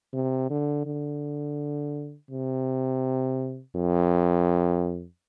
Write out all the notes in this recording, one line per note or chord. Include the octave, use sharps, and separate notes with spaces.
C3
D3
D3
C3
F2